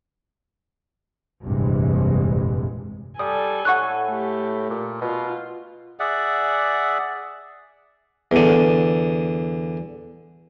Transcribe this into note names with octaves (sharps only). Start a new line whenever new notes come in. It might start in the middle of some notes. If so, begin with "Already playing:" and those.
F1 A#1 G2 C3 E3 G#3
G3 A4 G#5 D#6
A2 F#5 C#6 F#6
A3 G4
A#2
B2 F4
G#4 D5 E5 F#5
E2 D3